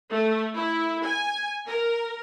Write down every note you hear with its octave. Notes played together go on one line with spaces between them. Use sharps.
A3
E4
G#5
A#4